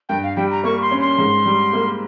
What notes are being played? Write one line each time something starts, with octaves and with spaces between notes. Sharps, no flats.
G2 G5
F5
G3 G5
A#5
A#3 C#6
C6
C#4
C6
G#2
G3
A#3